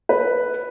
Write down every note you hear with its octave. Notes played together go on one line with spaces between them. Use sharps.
B4